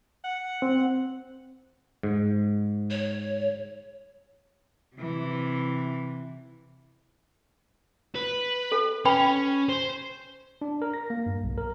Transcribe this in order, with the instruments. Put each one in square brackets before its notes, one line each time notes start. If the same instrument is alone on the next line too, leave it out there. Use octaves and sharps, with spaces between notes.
[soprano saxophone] F#5
[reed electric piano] C4
[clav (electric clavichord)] G#2
[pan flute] C#5
[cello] C3 E3
[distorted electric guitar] B4
[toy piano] A4
[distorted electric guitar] C#4 [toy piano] B4 G5 B5
[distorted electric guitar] C5
[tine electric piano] D4
A#4
A#6
A#3
G2
B1
A#4